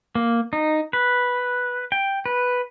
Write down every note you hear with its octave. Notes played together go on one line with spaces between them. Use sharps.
A#3
D#4
B4
G5
B4